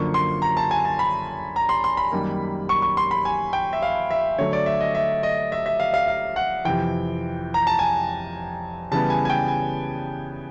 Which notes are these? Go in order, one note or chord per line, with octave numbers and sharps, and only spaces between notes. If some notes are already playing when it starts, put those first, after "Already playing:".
Already playing: F#2 D3 F3 A#3 C#6
C6
A#5
A5
G#5
A5
B5
A#5
C6
C6
B5
F#2 D#3 G3 A#3
C#6
C#6
C6
B5
G#5
G5
E5
F5
E5
D3 F#3 A3 C#5
D5
E5
D#5
E5
D#5
E5
E5
F5
F5
F5
F#5
F2 C3 E3 G5
A#5
A5
G#5
C#3 E3 G3 B3 A5
G#5
G#5
G5
G#5